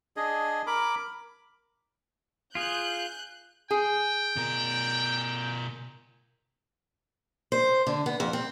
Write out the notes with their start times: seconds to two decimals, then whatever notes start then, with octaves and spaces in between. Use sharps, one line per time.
0.17 D4 G#4 D#5
0.67 A#4 B5 D6
2.55 F4 G#4 F#6 G6
3.71 G#4 G5
4.36 B2 A#4
7.52 C5
7.87 D3
8.06 B3
8.20 F2
8.33 C4